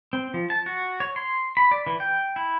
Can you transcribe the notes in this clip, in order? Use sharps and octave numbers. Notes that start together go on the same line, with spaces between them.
C4
F3
A5
F#4
C#5
C6
B5
D5
E3
G5
E4